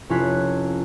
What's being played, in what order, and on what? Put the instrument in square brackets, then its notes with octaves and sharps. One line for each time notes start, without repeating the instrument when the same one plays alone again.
[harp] F1 C#4 E4 F4 F#6 B6